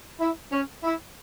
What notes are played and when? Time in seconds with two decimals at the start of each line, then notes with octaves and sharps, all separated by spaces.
0.20 E4
0.51 C#4
0.83 E4